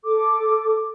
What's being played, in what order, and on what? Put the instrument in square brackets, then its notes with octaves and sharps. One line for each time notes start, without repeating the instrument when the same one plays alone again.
[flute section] A4 D6